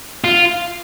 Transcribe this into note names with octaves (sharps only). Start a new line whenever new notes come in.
F4